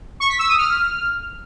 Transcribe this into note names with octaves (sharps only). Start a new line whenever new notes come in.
C#6
B6
E6
D#6
F6